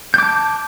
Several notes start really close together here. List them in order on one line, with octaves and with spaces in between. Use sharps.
G6 D6 A5